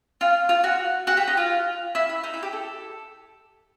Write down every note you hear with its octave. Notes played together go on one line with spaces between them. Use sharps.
F4
F4
F#4
F#4
G4
D#4
F4
E4
E4
D#4
E4
G4
A4